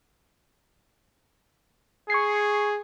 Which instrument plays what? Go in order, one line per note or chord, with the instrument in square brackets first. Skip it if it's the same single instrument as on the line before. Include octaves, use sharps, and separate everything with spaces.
[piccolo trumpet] G#4 [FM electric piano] C#6 G#6 C7